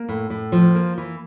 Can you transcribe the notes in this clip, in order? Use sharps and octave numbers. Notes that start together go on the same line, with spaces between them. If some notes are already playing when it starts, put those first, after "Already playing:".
Already playing: A#3
A2
A2
F3
A#3
E3